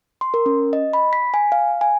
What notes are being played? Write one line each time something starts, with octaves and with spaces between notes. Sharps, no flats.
C6
A#4
C#4
D#5
B5
B6
G#5
F5
G#5